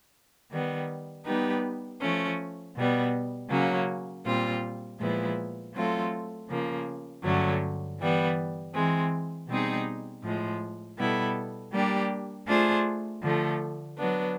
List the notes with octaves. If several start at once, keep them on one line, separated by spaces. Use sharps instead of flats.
D#3 G3 B3
G3 B3 D#4 G4 B4
F3 A3 C#4
B2 G3 B3
C#3 F#3 A#3 C#4
A#2 G3 C4 F4
A#2 F3 G#3 B3 E4
F#3 A3 C4 F4 A4
C#3 F3 A#3
G2 D3 F#3 A3 C#4
E3 G3 B3
E3 G#3 C4
B2 G3 C4 D#4 G#4
A2 F3 G#3
B2 G3 B3 E4 A4
G3 A#3 D4 G4
A3 D4 F4 G#4 C5
D3 F3 A3
F#3 B3 D4